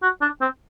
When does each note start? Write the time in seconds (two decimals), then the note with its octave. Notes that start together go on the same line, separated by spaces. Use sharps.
0.03 F#4
0.22 D4
0.41 C4